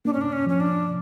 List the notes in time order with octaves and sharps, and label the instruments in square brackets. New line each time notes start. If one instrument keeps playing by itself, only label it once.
[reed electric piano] A#3 [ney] D4
[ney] C#4
D4
C#4
[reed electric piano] F3 [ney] C#4
[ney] D4